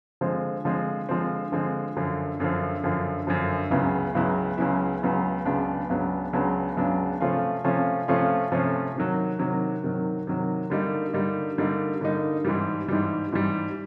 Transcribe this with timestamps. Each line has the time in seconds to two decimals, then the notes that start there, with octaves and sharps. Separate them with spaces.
0.21 D3 F3 G#3 C4
0.65 D3 F3 G#3 C4
1.09 D3 F3 G#3 C4
1.52 D3 F3 G#3 C4
1.97 F#2 D3 F3
2.40 F#2 D3 F3
2.84 F#2 D3 F3
3.27 F#2 D3 F3
3.70 C#2 C#3 F#3 B3 E4
4.15 C#2 C#3 F#3 B3 E4
4.58 C#2 C#3 F#3 B3 E4
5.03 C#2 C#3 F#3 B3 E4
5.45 C#2 C#3 F#3 B3 D4
5.89 C#2 C#3 F#3 B3 D4
6.33 C#2 C#3 F#3 B3 D4
6.76 C#2 C#3 F#3 B3 D4
7.21 C3 F3 A3 C#4 F4
7.64 C3 F3 A3 C#4 F4
8.08 C3 F3 A3 C#4 F4
8.52 C3 F3 A3 C#4 F4
8.95 C3 D#3 F#3
9.39 C3 D#3 F#3
9.83 C3 D#3 F#3
10.27 C3 D#3 F#3
10.70 D3 G3 A#3 D#4
11.13 D3 G3 A#3 D#4
11.58 D3 G3 A#3 D#4
12.01 D3 G3 A#3 D#4
12.45 G#2 E3 G3
12.88 G#2 E3 G3
13.33 G#2 E3 G3